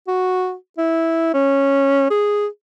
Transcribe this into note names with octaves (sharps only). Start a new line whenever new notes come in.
F#4
E4
C#4
G#4